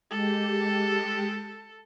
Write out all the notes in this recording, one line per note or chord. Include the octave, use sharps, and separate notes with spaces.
G#3 G4 A4